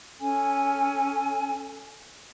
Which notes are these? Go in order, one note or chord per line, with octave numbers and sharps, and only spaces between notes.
C#4 A4 G#5